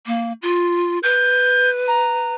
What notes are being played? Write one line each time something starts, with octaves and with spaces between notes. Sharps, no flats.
A#3
F4
B4 G6
A#5